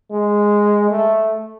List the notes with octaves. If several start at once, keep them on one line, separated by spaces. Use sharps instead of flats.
G#3
A3